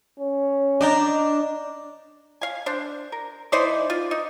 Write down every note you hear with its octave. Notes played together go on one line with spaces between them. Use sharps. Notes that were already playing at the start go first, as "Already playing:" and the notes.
C#4
D4 D#5 G5 A#5
F5 G#5
D4 C5
A#4
E3 D#4 C5 D5
F4
D#4